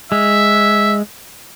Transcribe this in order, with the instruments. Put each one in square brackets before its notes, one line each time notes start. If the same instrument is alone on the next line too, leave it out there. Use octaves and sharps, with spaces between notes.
[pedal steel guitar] G#3 [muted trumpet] E5